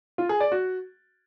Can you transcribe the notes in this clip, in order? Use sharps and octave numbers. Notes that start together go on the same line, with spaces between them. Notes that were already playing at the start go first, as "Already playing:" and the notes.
F4
G#4
D5
F#4